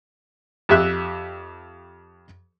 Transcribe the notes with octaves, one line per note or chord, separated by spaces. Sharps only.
F2 G4 E5 F#6